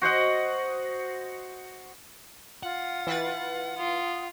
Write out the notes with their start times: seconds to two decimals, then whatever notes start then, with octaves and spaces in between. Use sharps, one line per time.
0.02 F#4 C5 D#5 F#5
2.63 F4 F#5
3.07 E3 B4 A6
3.78 F4 D#6